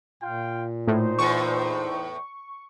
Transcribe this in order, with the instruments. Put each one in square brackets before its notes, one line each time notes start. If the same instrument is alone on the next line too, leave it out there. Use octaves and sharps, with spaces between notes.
[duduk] A#2 [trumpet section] F4 F5 G5
[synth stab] A2 [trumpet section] D#4 C5
[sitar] E2 A2 [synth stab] C#6